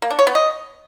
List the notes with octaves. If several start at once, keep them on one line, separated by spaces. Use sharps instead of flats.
A#3
D4
C#5
B3
D#5